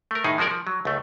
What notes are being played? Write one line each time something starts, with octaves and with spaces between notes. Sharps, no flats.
A3 A#4
A2 D#3 D#4 G#4
F3 G#3 F#4 A#4 D5
F3
F#3
C#2 A3